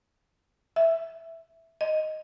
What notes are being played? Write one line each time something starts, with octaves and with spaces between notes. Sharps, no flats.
E5
D#5